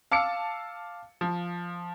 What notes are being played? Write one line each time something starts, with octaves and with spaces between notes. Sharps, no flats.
F5 A5 D6 E6 C#7
F3